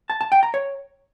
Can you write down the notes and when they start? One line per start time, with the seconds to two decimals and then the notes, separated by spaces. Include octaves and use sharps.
0.10 A5
0.21 A5
0.32 G5
0.43 A#5
0.54 C#5